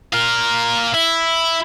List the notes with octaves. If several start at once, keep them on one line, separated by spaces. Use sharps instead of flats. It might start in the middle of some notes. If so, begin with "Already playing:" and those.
F4 A#4
E4